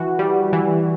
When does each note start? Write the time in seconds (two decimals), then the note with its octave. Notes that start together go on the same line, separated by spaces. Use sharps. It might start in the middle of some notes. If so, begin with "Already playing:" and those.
Already playing: E3 F#4
0.19 G3
0.53 E3